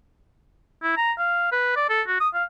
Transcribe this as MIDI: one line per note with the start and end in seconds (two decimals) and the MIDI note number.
0.83 0.97 64
0.97 1.12 82
1.18 1.48 77
1.52 1.74 71
1.76 1.88 74
1.90 2.02 69
2.07 2.18 66
2.20 2.29 87
2.34 2.44 77